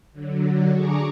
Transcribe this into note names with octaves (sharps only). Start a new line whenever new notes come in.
D3 F#3
D4 G#4 A#5 C#6 D6